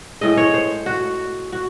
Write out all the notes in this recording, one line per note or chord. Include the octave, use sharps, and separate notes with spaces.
A2 G#3 D#5
C#5
C5
F#4
F#4